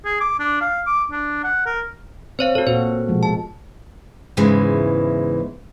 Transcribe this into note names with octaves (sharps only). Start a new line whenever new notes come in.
G#4
D6
D4
F5
D6
D4
F#5
A#4
C4 C5 C#5 F5
F#4 A4 C#5
A#2 F#4 C5
B2 F3 G#3
A5
E2 G#2 C#3 E3 G#3